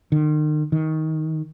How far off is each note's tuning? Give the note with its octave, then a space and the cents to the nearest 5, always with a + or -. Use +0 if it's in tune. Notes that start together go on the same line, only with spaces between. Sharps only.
D#3 -40
D#3 +15